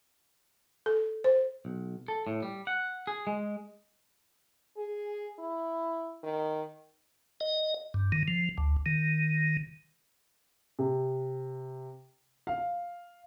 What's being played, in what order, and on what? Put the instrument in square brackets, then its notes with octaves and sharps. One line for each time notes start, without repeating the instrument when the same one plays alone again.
[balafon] A4
C5
[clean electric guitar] B1
A4
A2
G3
F#5
G#4
G#3
[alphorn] G#4
E4
D#3
[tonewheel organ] D#5
G2
D#3
F3
D2
D#3
[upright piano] C3
F5